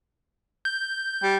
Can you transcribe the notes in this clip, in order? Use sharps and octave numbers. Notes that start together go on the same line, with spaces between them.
G6
G3